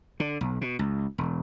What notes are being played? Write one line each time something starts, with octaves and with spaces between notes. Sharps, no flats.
D3
B1
B2
C#2
E1